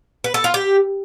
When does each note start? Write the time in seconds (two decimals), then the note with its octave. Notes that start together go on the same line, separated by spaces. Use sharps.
0.24 B4
0.34 A4
0.44 F4
0.54 G4